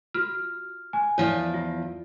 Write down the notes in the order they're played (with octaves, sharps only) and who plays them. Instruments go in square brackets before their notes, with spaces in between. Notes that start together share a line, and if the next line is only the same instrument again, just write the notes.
[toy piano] F4 F#4 [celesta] F6
[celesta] G#5
[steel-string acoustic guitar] E2 F3 D5 [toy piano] E4 C#5
[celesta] F4